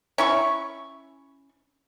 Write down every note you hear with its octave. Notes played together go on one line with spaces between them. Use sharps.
C#4 E4 C#6